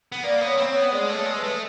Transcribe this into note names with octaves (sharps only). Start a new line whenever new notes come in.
B3
A#3 D5
B3
C#5
C4
C#5
B3
G#3 D5
A3
C#5
G#3
B4
A3